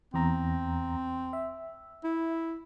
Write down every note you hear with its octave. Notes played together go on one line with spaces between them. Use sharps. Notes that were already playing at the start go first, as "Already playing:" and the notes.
E2 C4 A#5
E5
E4